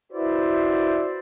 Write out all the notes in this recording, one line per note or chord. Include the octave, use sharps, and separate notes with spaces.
E4 F#4 B4 C5 D5 E5